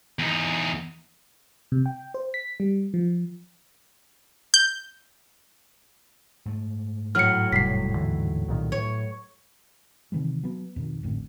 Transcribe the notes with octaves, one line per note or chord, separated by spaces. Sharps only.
E2 D#4
C3
G5
C5
B6
G3
F3
G6
G#2 A3
A2 F#3 F6 C#7
E1 C3 G3 B6 C7
D#2 D3 E3
C2 A#2 D#3
A2 C#5
C3 D#3 E3 G#3
F#3 B3
F2 B2 D#3
G#1 F2 A2 D3